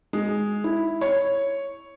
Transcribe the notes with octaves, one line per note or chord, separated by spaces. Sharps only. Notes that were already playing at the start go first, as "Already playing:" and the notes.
G#3
E4
C#5